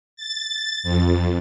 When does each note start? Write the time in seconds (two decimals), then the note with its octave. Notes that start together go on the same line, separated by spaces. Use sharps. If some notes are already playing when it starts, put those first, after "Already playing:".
0.16 A6
0.83 F2